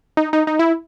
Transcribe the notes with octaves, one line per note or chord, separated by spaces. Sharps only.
D#4
D#4
D#4
E4